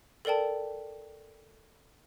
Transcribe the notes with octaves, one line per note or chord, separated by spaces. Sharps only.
A4 A#4 D5 G5 A5